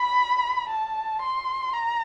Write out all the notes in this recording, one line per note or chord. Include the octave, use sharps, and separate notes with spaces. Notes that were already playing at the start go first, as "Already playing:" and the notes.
Already playing: B5
A5
C6
A#5